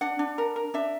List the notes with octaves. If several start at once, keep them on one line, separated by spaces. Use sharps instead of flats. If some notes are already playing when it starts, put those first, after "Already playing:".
D4 F#5
D4
A#4
A#4
D4 E5